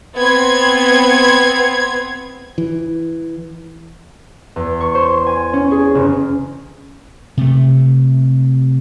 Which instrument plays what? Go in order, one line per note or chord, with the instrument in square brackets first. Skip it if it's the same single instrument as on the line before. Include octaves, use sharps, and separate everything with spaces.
[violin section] B3 C4 G#6
[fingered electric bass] E3
[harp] E2
C#6
C5
G#5
C#4
G#4
F#1
[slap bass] C3 A3